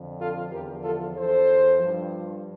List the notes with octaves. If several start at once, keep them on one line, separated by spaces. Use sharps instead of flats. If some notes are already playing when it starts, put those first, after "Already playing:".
Already playing: F2 D3 F3
F4 A4
E2 D3 F3 G4 A#4
F4 A4
E2 E3 A4 C5
G2 F3